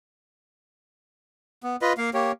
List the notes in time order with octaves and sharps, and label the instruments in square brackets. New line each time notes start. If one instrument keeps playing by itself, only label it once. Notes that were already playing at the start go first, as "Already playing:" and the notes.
[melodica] B3
F4 B4 D#5
A#3 F5
A#3 G4 C#5